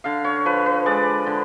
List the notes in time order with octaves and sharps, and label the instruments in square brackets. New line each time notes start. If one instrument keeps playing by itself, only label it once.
[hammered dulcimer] D3 F5
C#5
F3 B4
B4
G#3 D5
D3